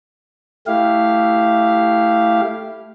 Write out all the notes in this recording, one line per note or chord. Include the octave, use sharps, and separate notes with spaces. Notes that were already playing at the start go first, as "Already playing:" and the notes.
A3 E4 G4 F5